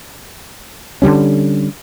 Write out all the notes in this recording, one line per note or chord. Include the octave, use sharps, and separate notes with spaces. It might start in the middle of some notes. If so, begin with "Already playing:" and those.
D3 D#3 G3 C#4